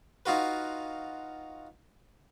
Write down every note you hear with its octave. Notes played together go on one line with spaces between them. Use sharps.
D#4 F4 F#4 B4